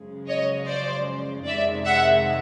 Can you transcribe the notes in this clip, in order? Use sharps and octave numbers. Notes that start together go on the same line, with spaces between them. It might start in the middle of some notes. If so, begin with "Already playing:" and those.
Already playing: F#2 C#3 F3 G#3
C#5 D#5
C5 D5
F2 C3 D#3 G#3 D5 E5
E5 F#5